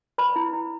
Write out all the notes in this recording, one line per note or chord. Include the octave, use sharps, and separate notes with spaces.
B4 B5
E4
E4